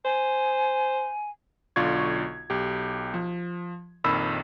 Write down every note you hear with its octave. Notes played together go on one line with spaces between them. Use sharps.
C5 G#5
B1 D3 F4 D5 C#6 G#6
B1 G4
F3
A#1 F2 D#3 B5 E6